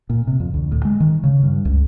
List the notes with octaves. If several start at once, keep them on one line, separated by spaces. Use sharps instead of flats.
A#2
C3
F2
D2
A2
G#3
D#3
C#3
G2
C#2